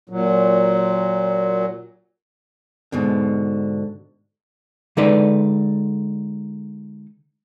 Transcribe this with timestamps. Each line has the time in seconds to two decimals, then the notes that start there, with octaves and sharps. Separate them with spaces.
0.09 A#2 F#3
2.92 G#2 B2 D3
4.97 D3 G#3 D#4 A4 B4 D5